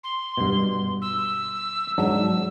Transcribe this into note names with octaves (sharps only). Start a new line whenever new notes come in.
C6
G2 B2
E6
G#2 F#3 D4 E6